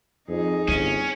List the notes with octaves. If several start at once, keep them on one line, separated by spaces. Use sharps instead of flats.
F2 D#4 G#4
G1 C4 C#4